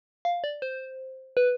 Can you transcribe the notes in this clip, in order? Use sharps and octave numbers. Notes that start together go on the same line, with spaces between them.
F5
D5
C5
B4